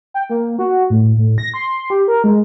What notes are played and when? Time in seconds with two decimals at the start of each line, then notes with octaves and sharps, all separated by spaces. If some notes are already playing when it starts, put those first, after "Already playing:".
0.14 G5
0.30 A#3
0.59 F#4
0.90 A2
1.17 A2
1.38 A#6
1.54 C6
1.90 G4
2.08 A#4
2.24 G#3